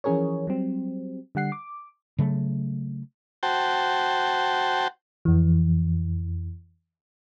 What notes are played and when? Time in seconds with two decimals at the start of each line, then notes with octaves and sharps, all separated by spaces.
0.04 E3 F3 C#4 G#4 A#4 C#5
0.47 F#3 G3 C4
1.35 D3 G3 F#5 C7
1.52 D6
2.19 C#3 F#3 A3
3.43 F#4 C5 G5 A5
5.25 F2 E3